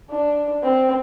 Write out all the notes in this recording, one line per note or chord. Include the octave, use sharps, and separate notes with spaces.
D4
C4